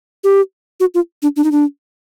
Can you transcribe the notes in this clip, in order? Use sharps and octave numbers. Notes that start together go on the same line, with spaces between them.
G4
F#4
F4
D4
D4
D#4
D4